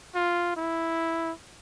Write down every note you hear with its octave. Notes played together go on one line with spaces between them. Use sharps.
F4
E4